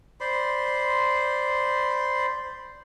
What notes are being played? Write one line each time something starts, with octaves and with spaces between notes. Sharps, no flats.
C5 D5 B5 C6